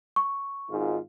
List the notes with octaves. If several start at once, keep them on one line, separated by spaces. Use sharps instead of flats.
C#6
G#1 G#2 F4